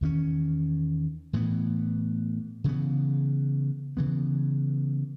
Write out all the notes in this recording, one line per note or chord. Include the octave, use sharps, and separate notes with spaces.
E2 D#3 A3 C#4
A2 E3 B3
C#3 E3 B3
C#3 E3 B3